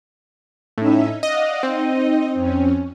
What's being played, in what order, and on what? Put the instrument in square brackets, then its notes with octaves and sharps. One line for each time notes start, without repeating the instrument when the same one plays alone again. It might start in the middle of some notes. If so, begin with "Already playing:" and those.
[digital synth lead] A2 [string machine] C#4 D#4 E5
[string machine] D5 F5 F#5 [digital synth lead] D#5
[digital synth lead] C4 [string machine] D#4 D#5
[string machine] F2 C#4